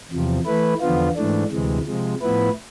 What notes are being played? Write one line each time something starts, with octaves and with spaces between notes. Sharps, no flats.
E2 C3 F3
E3 A3 E4 B4
E2 D3 F3 B3 F4
G#2 E3 A3 D4
D2 C3 E3 G#3
C3 F3 G#3
A2 F3 B3 E4 B4